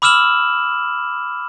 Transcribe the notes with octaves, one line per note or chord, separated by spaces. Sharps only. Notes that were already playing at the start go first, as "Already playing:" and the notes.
B5 D6 E6 F6 E7 F#7